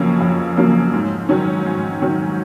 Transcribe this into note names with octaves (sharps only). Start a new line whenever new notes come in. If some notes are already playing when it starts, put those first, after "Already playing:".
Already playing: F2 C#3 F#3 A#3 C#4
F2
C#3 F#3 A#3 C#4
G#2
D#3 F#3 C#4
G#2
D#3 F#3 C#4